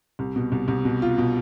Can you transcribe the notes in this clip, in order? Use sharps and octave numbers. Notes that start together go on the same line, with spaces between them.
C2
B2
C2
C2
B2
F4
B2